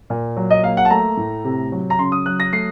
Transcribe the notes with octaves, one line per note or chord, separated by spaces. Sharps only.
A#2
F#3
D#5
A#3 F5
F#5
A5
A3 A#5
A2
C3
F#3
A#5
C#3 C6
D#6
F#3 F#6
A#6
A3 C7